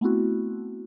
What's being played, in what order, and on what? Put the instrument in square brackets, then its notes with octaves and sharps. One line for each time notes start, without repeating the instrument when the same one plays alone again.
[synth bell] A3 B3 C4 E4 F#4